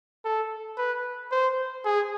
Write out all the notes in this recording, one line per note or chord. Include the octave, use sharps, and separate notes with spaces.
A4
B4
C5
G#4